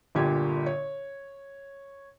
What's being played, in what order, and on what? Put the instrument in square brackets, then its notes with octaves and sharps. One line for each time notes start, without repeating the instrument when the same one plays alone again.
[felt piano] G1 A#2 D3 G4 G#6
C#5